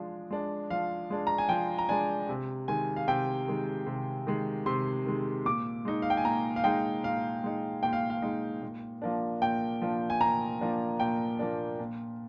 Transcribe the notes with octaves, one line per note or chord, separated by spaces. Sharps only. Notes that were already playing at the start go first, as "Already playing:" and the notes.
Already playing: F3 G#3 D4
G#3 D4
F3 F5
G#3 D4
A#5
G#5
F3 G5
A#5
G#3 D4 G#5
C3
D#3 G#3 G#5
F5
C3 G5
D#3 G#3
C3
D#3 G#3
C3 C6
D#3 G#3
A#2 D6
G#3 D#4
F5
G5
G#5
A#2 A#5
F5
G#3 D#4 G5
A#2 F5
G#3 D#4
A#2 G5
F5
F5
G#3 D#4
A#2
F3 A#3 D4
A#2 G5
F3 A#3 D4
G#5
A#2 A#5
F3 A#3 D4
A#2 G5
F3 A#3 D4
A#2